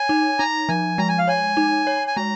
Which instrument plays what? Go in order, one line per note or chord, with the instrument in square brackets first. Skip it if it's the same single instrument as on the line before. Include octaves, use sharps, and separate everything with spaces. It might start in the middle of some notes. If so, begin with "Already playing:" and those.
Already playing: [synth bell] C#5 [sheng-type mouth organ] G#5
[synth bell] D#4
[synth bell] D#4 [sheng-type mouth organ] A#5
[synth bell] F3 [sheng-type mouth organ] G#5
[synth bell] G#3 [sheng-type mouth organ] A#5
[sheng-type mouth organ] G#5
F5
[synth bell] C#5 [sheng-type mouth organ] G#5
[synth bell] D#4
C#5
[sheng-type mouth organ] G#5
[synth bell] G#3 [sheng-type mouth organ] A#5